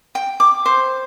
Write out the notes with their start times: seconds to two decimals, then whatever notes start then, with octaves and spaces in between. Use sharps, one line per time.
0.15 G5
0.40 D6
0.66 C5